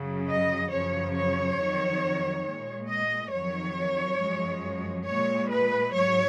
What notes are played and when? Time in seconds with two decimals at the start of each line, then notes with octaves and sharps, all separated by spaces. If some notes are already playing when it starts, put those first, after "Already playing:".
Already playing: F#2 C#3 F#3
0.27 D#5
0.70 F#2 C#3 F3 C#5
1.15 C#5
1.59 F2 D#3 F#3
2.45 A#2 G#3
2.88 D#5
3.32 F2 D#3 F#3 C#5
4.19 F#2 F3 G#3
5.06 A#2 G#3 C#5
5.50 B4
5.93 G#2 F#3 C#5